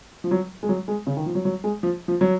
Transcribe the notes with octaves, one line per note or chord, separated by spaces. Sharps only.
F3
F#3
G#3
F#3
G#3
C#3
D#3
F3
F#3
F#3
G#3
F3
F3
F#3